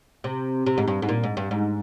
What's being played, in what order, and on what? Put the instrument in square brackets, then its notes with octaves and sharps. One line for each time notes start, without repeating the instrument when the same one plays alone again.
[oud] C3
C3
G#2
G2
G#2
A#2
G#2
G2
G#2